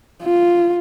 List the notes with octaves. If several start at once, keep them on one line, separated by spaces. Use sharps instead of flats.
F4